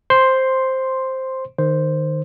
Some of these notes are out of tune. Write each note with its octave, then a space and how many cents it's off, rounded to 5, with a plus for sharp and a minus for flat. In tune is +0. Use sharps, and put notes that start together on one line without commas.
C5 +5 C6 +0
D#3 -20 C5 +0